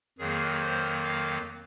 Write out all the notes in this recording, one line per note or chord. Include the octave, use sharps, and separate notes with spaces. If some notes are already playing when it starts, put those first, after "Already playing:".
F2 D#3 F#3 A#3 G#4
C5
F5